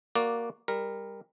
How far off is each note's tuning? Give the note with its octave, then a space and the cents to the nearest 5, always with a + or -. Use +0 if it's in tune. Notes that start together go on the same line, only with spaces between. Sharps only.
A#3 +0 F#4 +0 D5 +0
G3 +25 A#4 +0